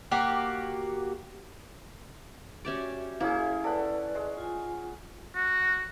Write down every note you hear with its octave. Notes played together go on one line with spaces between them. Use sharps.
A#3 F#4 G4
C#4 F#4 G4 D5 E5
A#3 C#4 E4 G#4
A4 B4 D5 F#5
G#3
F4 G#5
F#4